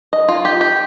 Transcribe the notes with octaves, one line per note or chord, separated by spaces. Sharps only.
D#5
F4
G4
G4